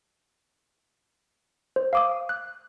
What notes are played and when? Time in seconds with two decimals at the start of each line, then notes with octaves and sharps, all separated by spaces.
1.76 C5
1.93 F5 D6 D#6
2.29 F#6